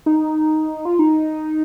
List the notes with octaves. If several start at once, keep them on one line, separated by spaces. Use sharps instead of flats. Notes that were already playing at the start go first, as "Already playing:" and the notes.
D#4
F4
D#4